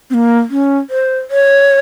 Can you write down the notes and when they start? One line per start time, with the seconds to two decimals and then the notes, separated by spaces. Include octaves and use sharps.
0.10 C4
0.14 A#3
0.50 C#4
0.90 C5
1.31 C#5